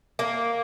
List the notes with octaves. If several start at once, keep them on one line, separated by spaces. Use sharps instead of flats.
A#3